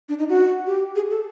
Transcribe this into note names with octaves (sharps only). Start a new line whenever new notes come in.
D4
D#4
F#4
G4
G#4
A4